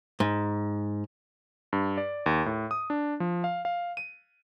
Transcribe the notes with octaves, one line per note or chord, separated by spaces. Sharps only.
G#2
G2
D5
D#2
A2
D#6
D4
F3
F5
F5
D#7